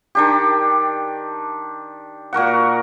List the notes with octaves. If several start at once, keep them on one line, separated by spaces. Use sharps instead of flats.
D#3 D4 G4
A#2 F#4 A#4 F#5